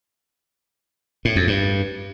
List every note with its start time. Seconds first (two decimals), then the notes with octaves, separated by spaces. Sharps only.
1.25 A2
1.36 F2
1.47 G2